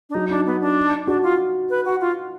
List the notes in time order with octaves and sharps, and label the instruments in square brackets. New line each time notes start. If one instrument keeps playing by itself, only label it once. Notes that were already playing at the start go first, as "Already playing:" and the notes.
[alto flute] D4
[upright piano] F#3 [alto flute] D#4
[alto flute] D4 [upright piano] D#4
[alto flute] B3
D4
[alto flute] D4 [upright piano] F#4
[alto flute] F4
B4
F#4
F4